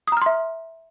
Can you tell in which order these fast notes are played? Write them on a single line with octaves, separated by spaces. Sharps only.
D#6 A#5 F6 C6 E5